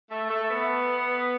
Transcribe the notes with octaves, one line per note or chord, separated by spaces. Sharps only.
A3
A3
B3